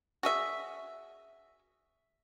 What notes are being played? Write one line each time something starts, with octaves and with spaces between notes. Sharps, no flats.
F#4 G#4 E5